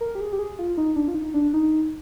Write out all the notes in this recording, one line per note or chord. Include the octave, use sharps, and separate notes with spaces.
A#4
G4
G#4
G4
G#4
F4
D#4
D4
F4
D#4
D4
D#4